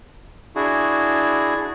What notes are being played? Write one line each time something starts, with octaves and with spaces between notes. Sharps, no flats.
D4 E4 F#4 G#4